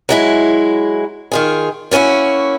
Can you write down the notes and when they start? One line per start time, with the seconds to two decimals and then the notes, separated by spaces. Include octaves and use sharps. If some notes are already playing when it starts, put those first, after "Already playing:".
0.09 F#3 G#3 E4
1.32 D#3 F4 G#4
1.91 A#3 B3 C#4 E4 F#4